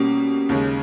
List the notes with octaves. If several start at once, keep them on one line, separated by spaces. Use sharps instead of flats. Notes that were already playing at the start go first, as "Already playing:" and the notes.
Already playing: B2 G3 A#3 C#4
D#2 C#3 G#3